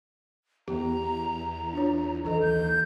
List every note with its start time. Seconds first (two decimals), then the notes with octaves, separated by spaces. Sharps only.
0.68 E2 B3 G4 A#5
1.73 D4 F4 C#5
2.25 B1 E3 A4 D#5 A#5
2.41 D#2 G6